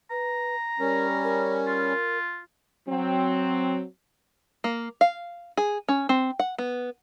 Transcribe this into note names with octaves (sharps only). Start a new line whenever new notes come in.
B4 A#5
G3 C#4 A#4
A#4
F4
F#3 C4
A#3
F5
G#4
C#4
C4
F#5
B3